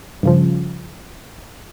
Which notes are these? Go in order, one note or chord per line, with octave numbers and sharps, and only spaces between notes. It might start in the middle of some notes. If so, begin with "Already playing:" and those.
G2 C#3 F3